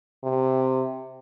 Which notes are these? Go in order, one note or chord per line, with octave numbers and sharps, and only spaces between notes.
C3